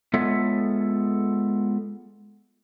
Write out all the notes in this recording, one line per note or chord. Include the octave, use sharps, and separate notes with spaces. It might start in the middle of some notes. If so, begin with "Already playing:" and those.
G#3 B3 F4 A4 C#5 E5